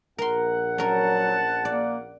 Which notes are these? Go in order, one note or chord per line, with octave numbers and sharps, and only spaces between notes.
A#1 A#4 F#5 C6
F#3 C#4 A#4 A5
A#3 D5